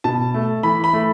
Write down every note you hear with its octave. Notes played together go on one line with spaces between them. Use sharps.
B2 A5
A3
E3 B5
B5
A3